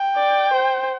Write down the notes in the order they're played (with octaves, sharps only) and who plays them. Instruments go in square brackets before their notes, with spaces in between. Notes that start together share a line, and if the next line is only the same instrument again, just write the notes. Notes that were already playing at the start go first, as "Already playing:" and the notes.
Already playing: [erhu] G5
[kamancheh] D5
C5